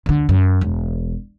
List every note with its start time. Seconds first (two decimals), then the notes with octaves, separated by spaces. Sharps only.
0.06 D2 D3
0.29 F#2
0.61 E1